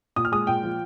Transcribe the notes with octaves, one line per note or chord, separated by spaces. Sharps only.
A#2 D#6
F6
G#3 D#6
A#2 G5
F3